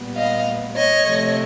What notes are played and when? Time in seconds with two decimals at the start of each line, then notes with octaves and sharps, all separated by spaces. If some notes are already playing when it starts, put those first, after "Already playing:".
Already playing: A#2 G3 B3
0.15 D#5 F5
0.76 C#5 D#5
1.06 C3 F3 A3